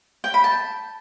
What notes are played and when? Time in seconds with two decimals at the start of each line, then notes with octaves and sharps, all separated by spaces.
0.24 G5
0.34 B5
0.44 A5